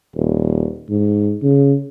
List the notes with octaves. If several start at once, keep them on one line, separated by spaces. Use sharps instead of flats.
D#1
G#2
C#3